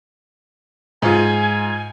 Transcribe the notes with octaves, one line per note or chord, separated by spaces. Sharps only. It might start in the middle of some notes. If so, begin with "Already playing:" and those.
G#2 F4 G#5